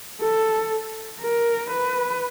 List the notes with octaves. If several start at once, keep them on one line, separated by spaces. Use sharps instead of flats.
A4
A#4
B4